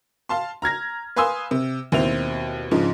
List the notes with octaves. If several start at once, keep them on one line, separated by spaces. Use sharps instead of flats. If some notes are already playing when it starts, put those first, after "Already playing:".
F5 A5 C6
A#5 F6 G#6 A#6
B4 F5 G#5 C6 D#6 E6
C3
D#2 B2 C4 E4 F7
G#2 C#3 F3 D4